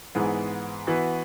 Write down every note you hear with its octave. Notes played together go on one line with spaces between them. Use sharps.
G#2 E3 B3 G#4
E3 B3 F#4